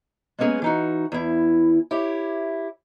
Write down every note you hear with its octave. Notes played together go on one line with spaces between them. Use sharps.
G#3 A#3 B3 C#4 G#4
E3 D#4 F#4
E2 E4
E4 G4 C#5